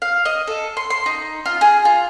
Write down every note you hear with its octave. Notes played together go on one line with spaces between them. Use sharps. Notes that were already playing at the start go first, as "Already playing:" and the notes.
F5
D#5
A4
C6
C6
D#4
F4
G#4
F4